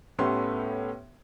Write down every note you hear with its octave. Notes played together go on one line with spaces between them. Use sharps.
A2 A3 B3 C#4 G4 C6